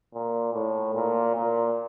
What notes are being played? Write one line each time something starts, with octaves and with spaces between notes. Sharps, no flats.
A#2
A2
A#2
A#2